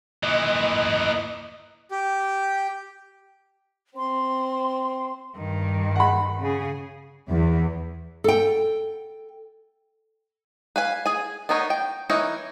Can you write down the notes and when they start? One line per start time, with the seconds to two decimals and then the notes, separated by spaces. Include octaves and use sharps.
0.23 A#2 E3 D#5
1.91 G4
3.97 C4 C6
5.37 G2 D#3
5.96 F#5 B5
6.40 C#3 G#4
7.30 E2
8.24 A4 G5
10.76 B4 F5 G#5
11.06 G#4 G#5
11.49 B3 D4 D#4 A#4 C#5
11.70 G5
12.10 E3 D#4 A#4 C#5